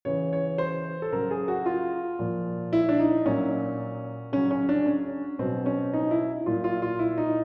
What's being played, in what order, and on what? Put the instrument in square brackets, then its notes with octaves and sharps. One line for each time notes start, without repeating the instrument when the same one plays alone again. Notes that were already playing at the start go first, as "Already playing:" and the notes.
[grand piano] C#3 E3 C#5
C#5
C5
A4
C#3 F#3 A#4
G#4
F#4
F4
A#2 F3
E4
D4
D#4
A#2 F#3 C#4
C#3 F#3 C#4
C#4
D4
C#4
B2 F#3 C4
C#4
D#4
E4
A#2 F#3 F4
F4
F4
E4
D#4